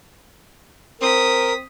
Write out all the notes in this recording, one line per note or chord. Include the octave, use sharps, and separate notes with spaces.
C4 A#4 D#6 B6